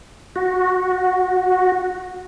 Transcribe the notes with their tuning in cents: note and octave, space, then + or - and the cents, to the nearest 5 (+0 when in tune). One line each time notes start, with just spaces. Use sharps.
F#4 -10